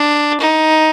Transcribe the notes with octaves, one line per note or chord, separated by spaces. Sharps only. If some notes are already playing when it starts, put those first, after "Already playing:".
Already playing: D4
D#4